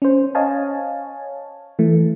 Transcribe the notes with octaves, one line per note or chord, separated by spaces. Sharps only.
C#4 C5
C#5 D#5 F5 G#5 A5
E3 A3